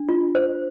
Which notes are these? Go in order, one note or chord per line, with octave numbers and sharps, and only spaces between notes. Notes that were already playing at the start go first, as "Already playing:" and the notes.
Already playing: D4
F4
C5